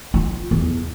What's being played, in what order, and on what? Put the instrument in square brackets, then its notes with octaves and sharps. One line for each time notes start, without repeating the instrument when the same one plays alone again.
[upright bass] F4
E2